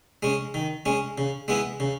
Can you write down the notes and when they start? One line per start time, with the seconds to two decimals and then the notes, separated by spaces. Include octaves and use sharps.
0.23 G#3 C#4
0.54 D#3
0.86 G#3 C#4
1.18 C#3
1.48 G#3 B3 E4
1.80 C#3